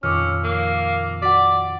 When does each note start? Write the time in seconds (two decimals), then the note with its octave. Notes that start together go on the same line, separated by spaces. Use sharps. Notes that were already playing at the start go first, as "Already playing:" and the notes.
0.03 F2 A#2 D#3 C#4 D6 E6 F6
0.44 A#3
1.22 F#4 D5 F#5 D6 B6